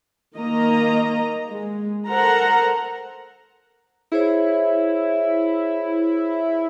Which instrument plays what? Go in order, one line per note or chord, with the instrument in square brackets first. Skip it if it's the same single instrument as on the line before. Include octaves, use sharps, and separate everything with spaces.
[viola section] D#3 A#3 D#5 A#5
G#3
A4 A#4 C5 F#5 A#5
[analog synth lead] E4 [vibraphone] G#4 C5 C#5